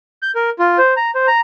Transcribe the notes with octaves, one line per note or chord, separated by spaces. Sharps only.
G6
A#4
F4
C5
A#5
C5
A#5